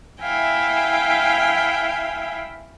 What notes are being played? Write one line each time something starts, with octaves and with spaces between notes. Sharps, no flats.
E4 E5 F5 G5 G#5